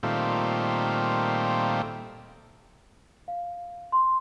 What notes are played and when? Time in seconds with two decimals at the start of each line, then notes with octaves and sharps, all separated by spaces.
0.03 A#2 D#3 G3 A3 C4 F4
3.28 F5
3.92 C6